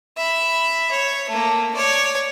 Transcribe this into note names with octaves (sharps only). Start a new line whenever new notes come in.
E5 B5
C#5
A3 A#3
C#5 D5